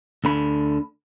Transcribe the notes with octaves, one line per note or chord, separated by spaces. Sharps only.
D2 D3 B5